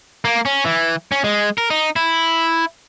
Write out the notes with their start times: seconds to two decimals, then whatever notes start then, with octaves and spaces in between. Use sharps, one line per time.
0.25 A#3
0.45 C#4
0.65 E3
1.12 C#4
1.24 G#3
1.58 A#4
1.70 D#4
1.96 E4